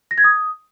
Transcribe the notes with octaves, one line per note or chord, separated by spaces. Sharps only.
A#6
G#6
D#6